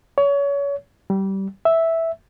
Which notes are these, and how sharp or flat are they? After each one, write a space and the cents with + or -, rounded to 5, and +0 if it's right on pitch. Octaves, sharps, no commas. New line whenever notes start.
C#5 +30
G3 -20
E5 -5